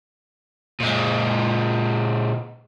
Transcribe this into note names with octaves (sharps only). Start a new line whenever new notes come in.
A#2 G#3